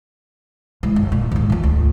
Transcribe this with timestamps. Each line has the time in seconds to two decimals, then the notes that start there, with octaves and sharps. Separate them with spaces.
0.83 E3 G#3
0.96 G1
1.12 A#2
1.32 D#2 G#2
1.50 E3 F4
1.63 D2